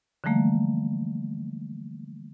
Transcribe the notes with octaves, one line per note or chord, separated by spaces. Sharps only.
D3 E3 F3 G3 A3 A#3